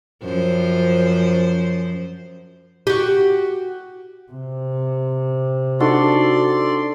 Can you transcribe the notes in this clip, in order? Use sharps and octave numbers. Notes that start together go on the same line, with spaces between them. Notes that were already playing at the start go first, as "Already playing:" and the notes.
F#2 F3 C5
F#4 G4
C3
D4 D#4 F#4 A4 D5 C6